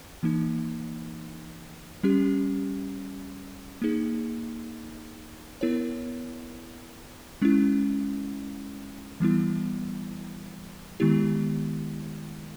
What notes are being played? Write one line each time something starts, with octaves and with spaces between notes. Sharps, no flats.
E3 A#3 D#4
G3 C#4 G4
A#3 D#4 G#4
B3 E4 A#4 C#5
G#3 C#4 E4
E3 G3 B3 E4
D#3 G#3 B3 E4 G4